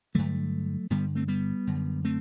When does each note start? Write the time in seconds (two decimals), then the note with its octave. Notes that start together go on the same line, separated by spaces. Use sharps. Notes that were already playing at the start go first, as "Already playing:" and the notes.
0.15 G2 D3 F#3 A3
0.90 G2 D3 G3 B3
1.15 A3 C4
1.28 G3 B3
1.67 F#2 D3
2.05 A3 C4